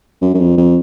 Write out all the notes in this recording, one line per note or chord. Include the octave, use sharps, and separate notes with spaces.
F#2
F#2
F2
F2